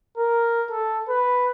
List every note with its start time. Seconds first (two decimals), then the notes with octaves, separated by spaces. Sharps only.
0.18 A#4
0.71 A4
1.09 B4